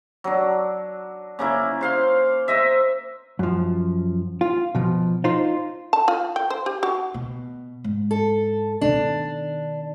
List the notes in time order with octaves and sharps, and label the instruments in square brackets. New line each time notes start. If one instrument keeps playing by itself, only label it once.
[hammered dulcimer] F#3 D4
C#3 A#3 E4
C5 F5 C6
C5 D#5 E5
[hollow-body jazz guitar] F#2 F3
F4
B2 F3
D#4 F4 C5
[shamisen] A5
F4
G5
C5
G4
F#4
[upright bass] B2
G#2
[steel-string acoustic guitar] A4
[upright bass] B2 D#3 [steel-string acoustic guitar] D4